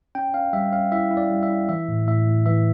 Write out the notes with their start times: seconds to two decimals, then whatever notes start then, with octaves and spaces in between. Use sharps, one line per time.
0.15 C#4 G5
0.34 C#4 F5
0.53 G3 E5
0.72 C#4 F5
0.92 E4 E5
1.11 E4
1.17 D5
1.31 G3
1.43 E5
1.50 E4
1.69 E3 E5
1.88 A2
2.07 A2 E5
2.27 A2
2.46 E3 E5